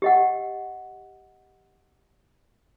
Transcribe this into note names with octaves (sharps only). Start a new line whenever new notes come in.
G4 D#5 F#5